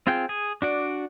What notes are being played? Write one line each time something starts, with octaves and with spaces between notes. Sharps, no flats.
C4 F4 G#4 G5
G#4
D4 F#4 D5